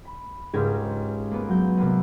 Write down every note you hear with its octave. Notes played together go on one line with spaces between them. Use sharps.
B5
C#2 G#2 C#4 G4 A#4 G#6
A#3 B3
F#3 G6
C3 A#3 B3